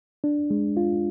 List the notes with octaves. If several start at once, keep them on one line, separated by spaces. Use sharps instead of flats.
D4
G#3
F4